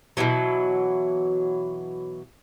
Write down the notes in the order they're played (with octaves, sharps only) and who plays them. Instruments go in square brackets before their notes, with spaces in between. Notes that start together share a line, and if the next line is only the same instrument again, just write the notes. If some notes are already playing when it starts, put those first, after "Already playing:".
[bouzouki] B2 D3 E3 F#3